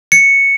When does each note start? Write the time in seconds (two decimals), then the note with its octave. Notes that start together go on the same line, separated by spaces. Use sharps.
0.12 C#7